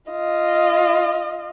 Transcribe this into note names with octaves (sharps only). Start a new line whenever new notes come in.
F4 D#5